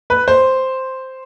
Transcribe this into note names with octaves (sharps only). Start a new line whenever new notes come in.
B4
C5